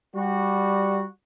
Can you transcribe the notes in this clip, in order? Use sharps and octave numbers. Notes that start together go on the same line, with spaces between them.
G3 F#4